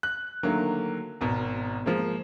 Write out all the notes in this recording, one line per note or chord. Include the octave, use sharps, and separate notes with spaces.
F#6
D3 D#3 F#3 A3 A#3
G#1 B2 A#4
F3 G#3 A#3